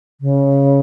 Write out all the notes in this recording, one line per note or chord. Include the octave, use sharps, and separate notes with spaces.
C#3